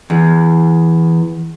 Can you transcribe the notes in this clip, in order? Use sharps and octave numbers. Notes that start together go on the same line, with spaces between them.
E2